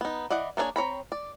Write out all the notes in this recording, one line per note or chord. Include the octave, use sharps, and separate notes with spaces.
B3 D#4
E3 D5 D#5 F#5
A#3 B3 D4 G#4 C#5
C4 C#5 A#5 B5
D5